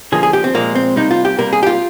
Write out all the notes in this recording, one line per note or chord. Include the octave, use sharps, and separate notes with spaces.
D3 F3 A#3 G#4
G#4
G4
C4
A#2 F3 G#3 A#3
C4
C3 G3 A#3 D#4
F4
G4
C3 G3 A#3 A#4
G#4
G4
F4